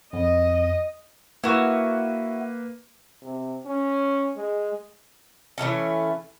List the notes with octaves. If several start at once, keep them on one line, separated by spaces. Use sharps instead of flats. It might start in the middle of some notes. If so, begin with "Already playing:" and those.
F2 D#5
A#3 E4 F#4 B4
C3
C#4
G#3
E3 F#3 A3 C#4